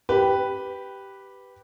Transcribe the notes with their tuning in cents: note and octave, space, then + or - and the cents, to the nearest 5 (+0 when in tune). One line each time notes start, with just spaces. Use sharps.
G4 -5 B4 +0